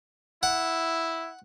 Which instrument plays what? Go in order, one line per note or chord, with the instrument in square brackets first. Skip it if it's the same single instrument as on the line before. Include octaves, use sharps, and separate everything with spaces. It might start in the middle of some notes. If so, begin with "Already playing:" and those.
[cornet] E4 [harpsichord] F#5